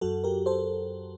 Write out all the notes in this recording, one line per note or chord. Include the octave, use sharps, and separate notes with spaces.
F#2 F#3 F#4 A4
G4 A#4
A4 C5